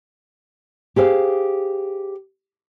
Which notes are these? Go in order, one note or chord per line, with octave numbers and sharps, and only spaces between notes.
G4 G#4 C5 F5